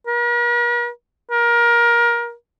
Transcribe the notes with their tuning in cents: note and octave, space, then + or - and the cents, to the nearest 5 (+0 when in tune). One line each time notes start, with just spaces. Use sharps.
A#4 +45
A#4 +25